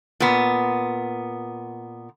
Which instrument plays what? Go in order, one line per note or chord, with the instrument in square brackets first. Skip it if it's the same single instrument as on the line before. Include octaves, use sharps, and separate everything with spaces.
[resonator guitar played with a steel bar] A#2 B3